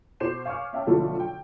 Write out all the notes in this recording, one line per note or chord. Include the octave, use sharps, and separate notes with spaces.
B2 C5 D6 G6 C7 E7
F5 G#5 C#6 D6 F6
C#4 E5 F5 G5 A5 E6
B1 B2 D3 F3 A3
G5